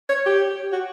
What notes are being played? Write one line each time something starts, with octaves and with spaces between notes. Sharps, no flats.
C#5
G4
F#4